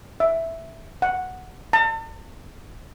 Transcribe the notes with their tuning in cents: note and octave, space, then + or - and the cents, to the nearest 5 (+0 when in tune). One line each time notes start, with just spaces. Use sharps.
E5 +0
F#5 +0
A5 +40